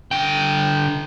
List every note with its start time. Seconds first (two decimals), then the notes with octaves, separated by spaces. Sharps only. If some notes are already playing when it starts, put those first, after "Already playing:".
0.11 D3 G5